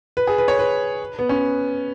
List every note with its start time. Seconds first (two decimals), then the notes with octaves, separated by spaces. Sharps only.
0.17 B4
0.27 G#4
0.38 B4
0.48 C#5
0.59 B4
1.19 B3
1.29 C#4